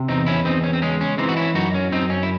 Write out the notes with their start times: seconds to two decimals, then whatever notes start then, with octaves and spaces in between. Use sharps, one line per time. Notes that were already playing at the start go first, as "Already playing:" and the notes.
Already playing: C3
0.08 E2 C4 D#4
0.26 C#4 E4
0.44 E2 C4 D#4
0.64 C#4
0.73 C4
0.82 G#3 C#4
1.01 C#4
1.18 E3 C4 D#4
1.29 F#4
1.37 C#4 E4
1.55 F#2 D#4 F#4
1.74 C#4
1.92 F#2 C4 D#4
2.10 C#4
2.23 E4